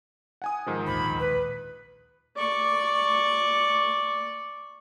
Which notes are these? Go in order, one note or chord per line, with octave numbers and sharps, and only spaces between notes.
F#5 G#5 D#6
G#2 D#3 F3
D1 A#1 D#2 B5
B4
D5 C#6